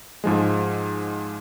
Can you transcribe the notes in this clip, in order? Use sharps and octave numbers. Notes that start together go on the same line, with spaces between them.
G#2 F3 G#3